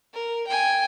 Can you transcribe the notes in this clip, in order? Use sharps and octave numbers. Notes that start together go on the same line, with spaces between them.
A#4
G5 G#5